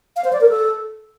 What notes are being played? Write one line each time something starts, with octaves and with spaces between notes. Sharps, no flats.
F5
C5
D5
A#4
A4